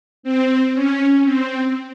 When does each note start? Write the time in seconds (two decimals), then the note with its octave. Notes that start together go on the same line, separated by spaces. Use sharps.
0.23 C4
0.74 C#4
1.24 C4